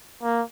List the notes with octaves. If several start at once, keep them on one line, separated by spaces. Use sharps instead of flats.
A#3